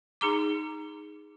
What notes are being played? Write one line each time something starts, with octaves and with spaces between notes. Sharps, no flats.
D#4 G#4 A#5 D6